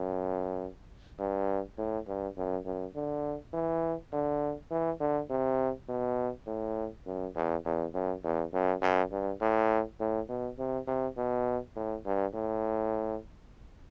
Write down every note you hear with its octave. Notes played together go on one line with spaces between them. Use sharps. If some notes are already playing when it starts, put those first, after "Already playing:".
Already playing: F#2
G2
A2
G2
F#2
F#2
D3
E3
D3
E3
D3
C3
B2
A2
F#2
E2
E2
F#2
E2
F#2
F#2
G2
A2
A2
B2
C3
C3
B2
A2
G2
A2